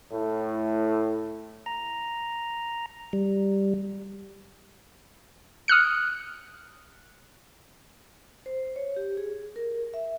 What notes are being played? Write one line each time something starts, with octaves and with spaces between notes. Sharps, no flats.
A2
A#5
G3
D#6 F6 F#6 C#7
C5
C#5
G4
G#4
A#4
E5